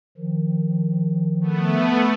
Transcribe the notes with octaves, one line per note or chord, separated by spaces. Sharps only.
D#3 F3
A3 B3